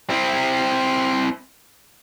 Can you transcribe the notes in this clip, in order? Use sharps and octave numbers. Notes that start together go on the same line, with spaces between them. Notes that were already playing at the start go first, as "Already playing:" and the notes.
C4 E4